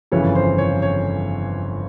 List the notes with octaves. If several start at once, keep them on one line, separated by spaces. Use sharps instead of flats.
G1 F2 C#3 E3 C#5
C5
C#5
C#5